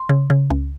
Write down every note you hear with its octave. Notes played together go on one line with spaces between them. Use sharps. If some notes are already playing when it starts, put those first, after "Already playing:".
Already playing: C6
C#3
C#3
C#2